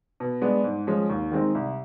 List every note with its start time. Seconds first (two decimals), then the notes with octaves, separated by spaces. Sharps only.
0.20 B2
0.42 G#3 B3 D4
0.64 G#2
0.87 F3 G#3 C#4
1.10 D#2
1.32 D#3 G#3 C4 D#4
1.55 C2